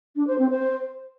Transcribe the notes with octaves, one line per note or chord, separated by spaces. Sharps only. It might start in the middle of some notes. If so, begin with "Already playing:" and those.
D4
C5
C4
C5